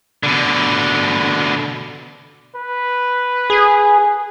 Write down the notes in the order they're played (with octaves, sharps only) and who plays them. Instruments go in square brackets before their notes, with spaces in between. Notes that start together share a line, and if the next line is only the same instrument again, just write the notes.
[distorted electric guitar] B2 D3
[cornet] B4
[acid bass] G#4